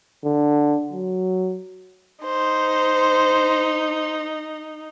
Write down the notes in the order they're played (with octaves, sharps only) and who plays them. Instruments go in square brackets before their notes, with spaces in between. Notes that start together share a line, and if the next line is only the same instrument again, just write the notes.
[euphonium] D3
F#3
[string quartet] D#4 [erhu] C5